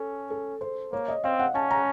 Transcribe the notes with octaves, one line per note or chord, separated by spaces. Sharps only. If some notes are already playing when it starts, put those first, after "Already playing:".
Already playing: C#4 A4
A4
C5
A#3 C#5
D#5
C4 F5
F#5
C#4 A5
A#5